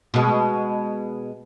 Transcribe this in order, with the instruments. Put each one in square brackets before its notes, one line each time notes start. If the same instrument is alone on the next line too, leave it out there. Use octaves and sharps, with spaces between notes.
[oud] B2 G#3